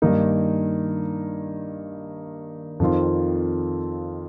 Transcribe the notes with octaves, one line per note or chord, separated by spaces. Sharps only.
G2 D#3 A#3 D#4
F2 D#3 C4 F4